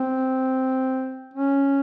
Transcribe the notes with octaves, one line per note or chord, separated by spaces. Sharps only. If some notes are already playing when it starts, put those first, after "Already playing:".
Already playing: C4
C#4